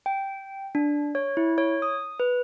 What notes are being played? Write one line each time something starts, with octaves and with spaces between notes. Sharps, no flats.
G5
D4
C#5
E4
C#5
D#6
B4